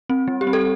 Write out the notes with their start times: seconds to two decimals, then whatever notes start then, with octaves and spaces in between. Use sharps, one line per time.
0.10 C4
0.28 G3
0.41 G4
0.47 C4
0.53 A4